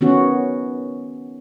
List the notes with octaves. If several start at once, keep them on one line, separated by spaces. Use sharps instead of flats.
D#3 B3 C#4 F#4